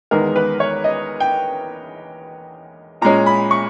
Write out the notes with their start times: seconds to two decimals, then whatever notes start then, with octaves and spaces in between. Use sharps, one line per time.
0.11 E2 D#3 G#3 B3 A#4
0.36 B4
0.60 C#5
0.84 D#5
1.20 G5
3.01 A#2 G#3 C#4 A#5
3.26 B5
3.51 C#6